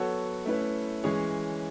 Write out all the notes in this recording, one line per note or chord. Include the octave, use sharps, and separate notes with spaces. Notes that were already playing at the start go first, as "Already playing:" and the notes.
Already playing: F#3 B3 F#4 A4 C#5
A3 C#4 E4 B4
E3 G#3 C#4 G#4 C#5